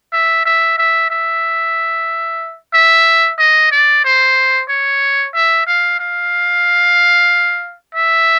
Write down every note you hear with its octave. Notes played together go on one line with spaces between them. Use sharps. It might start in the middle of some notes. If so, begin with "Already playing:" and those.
E5
E5
E5
E5
E5
D#5
D5
C5
C#5
E5
F5
F5
E5